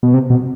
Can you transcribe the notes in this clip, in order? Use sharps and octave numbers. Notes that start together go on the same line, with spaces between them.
B2
C3
B2